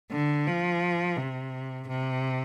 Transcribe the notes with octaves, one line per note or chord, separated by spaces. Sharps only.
D3
F3
C3
C3